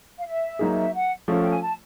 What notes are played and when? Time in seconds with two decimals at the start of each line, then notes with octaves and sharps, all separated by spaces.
0.19 F5
0.26 E5
0.59 F#3 A#3 D#4 G#4
0.94 F#5
1.28 F3 A3 C#4 F4
1.39 G5
1.50 G#5
1.62 A5